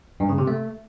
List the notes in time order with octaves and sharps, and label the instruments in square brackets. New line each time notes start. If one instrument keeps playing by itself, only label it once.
[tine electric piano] G2
C#3
C3
A3